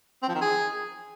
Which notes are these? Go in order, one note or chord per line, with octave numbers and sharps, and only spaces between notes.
C4
F3
D#3
G#4